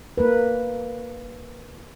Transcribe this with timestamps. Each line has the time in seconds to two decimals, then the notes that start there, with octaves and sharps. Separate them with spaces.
0.18 A#3 A#4 B4